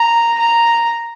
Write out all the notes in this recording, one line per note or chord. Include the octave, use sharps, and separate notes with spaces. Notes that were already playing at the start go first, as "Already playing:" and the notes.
Already playing: A#5
A#5